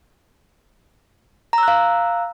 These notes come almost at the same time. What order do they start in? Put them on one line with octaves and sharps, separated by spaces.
A#5 E6 F#6 F5